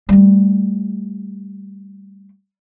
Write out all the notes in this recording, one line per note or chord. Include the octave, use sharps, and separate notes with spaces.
G3 A3